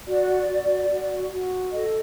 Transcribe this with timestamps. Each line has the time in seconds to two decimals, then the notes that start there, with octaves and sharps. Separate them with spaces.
0.07 F#4 D5
0.48 F#4
0.90 F#4
1.31 F#4
1.73 A4 D#5